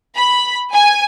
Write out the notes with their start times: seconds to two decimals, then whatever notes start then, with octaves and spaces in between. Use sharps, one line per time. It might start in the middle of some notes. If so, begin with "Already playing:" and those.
0.15 B5
0.72 G#5